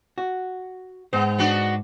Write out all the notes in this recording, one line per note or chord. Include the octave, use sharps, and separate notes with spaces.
F#4
G#2 B3 C5
B3 D4 F#4